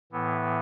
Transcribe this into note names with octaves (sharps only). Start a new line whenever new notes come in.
A2 E3 B3